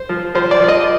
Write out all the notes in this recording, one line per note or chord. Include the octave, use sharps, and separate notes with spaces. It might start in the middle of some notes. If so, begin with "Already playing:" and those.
Already playing: C5
F3
F3 C5
D5
F3
D#5